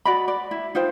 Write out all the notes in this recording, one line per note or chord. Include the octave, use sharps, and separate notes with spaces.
F#4 D5 D#5 B5
D5
E4
D#4 F4 C5 G5